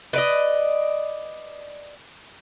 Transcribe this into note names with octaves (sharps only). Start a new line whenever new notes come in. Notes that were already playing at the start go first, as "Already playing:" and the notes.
B4 D5 D#5